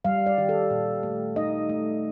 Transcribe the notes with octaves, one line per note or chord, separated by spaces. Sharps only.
G3 F5
D5
D#3 G4
A4
A#2
A3
D#4 D#5
A3